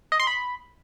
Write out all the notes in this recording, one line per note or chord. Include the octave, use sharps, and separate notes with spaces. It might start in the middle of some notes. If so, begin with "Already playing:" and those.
D#5
C6
B5